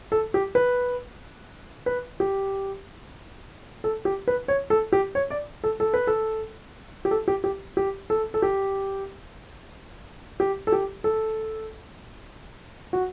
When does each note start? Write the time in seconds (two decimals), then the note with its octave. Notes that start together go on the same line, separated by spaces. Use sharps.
0.12 A4
0.34 G4
0.55 B4
1.86 B4
2.20 G4
3.84 A4
4.05 G4
4.28 B4
4.48 C#5
4.70 A4
4.92 G4
5.15 C#5
5.30 D5
5.64 A4
5.80 A4
5.94 B4
6.07 A4
7.05 G4
7.11 A4
7.28 G4
7.44 G4
7.77 G4
8.10 A4
8.34 A4
8.42 G4
10.40 G4
10.67 A4
10.72 G4
11.04 A4
12.93 F#4